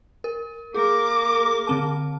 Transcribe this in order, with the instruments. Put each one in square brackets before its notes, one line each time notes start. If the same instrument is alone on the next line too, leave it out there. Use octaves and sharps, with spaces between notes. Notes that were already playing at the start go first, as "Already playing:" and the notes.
[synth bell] A#4
[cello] A#3 A#4 [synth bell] G#4 [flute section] D6
[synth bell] D3 C4 A5